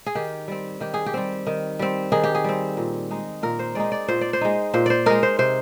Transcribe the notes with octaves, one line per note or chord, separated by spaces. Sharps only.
G#4
D#3 G4
G3 C4
D#3 G4
G#4
G4
G3 C4
D#3
G3 C4
D#3 G#4
G4
G#4
G3 C4
A#2
G#3 D#4
A#2 A#4
C5
G#3 D#4 D5
D5
A#2 C5
D5
C5
G#3 D#4
A#2 C5
C5 D5
G#3 D#4 A#4
C5
C3 C5